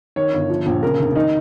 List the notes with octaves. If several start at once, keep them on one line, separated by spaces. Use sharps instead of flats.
D#3 C#5
G1
F3
A#1
C#3 A#4
F1
D#3 D#4